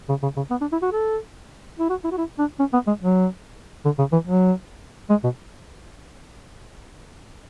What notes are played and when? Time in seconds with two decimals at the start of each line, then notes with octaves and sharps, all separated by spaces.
0.09 C#3
0.23 C#3
0.36 C#3
0.51 B3
0.61 D4
0.72 E4
0.82 F#4
0.92 A4
1.79 E4
1.90 F#4
2.04 E4
2.11 F#4
2.18 E4
2.39 D4
2.59 C#4
2.73 B3
2.87 G#3
3.01 F#3
3.85 D3
3.99 C#3
4.12 E3
4.27 F#3
5.10 G#3
5.24 B2